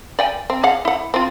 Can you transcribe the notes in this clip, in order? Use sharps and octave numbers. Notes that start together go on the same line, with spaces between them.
D5 G5 G#5
C4
G#4 F5 F#5
E4 F#5
C4 F4